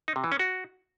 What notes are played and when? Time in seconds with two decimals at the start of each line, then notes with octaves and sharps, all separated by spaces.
0.08 D#4
0.16 C3
0.24 E3
0.32 C#4
0.39 F#4